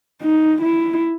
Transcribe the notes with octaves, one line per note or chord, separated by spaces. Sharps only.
D#4
E4